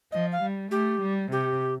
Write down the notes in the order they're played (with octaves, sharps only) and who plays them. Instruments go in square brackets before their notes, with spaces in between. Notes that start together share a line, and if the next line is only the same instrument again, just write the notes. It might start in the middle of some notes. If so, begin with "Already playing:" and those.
[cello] F3 [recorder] D#5
[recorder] F5
[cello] G3
[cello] A3 [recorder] G4
[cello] G3
[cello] C3 [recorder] G4